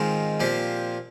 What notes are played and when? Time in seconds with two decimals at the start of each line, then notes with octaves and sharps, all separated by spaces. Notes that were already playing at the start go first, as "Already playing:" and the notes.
Already playing: G#2 D#3 G#3 C4 F4
0.40 A#2 F3 C4 G4 C5